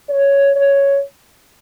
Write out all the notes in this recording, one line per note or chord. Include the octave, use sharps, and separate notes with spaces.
C#5
C#5